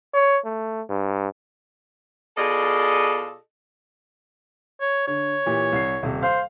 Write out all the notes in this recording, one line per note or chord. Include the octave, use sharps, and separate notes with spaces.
C#5
A3
G2
B2 F4 G#4 A4 D5 D#5
C#5
D3 C#5
A#2 E3 G4
C2 C7
D#1 C3
C5 F5